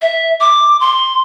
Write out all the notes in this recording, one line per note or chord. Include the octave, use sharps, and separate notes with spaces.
E5
D6
C6